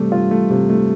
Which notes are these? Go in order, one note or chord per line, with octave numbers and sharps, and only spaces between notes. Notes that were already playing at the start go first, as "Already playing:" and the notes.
Already playing: C3 G3 A3
F4
A3
C3
A3